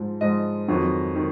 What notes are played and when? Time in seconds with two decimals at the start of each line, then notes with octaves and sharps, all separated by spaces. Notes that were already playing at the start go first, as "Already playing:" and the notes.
Already playing: G#2 F3
0.21 G#2 F3 D#5
0.68 F2 D#3 F#3
1.16 D#3